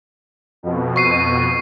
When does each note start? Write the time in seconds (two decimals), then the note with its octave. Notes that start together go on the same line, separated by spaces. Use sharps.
0.63 F2 B2
0.96 C#6 C7 D#7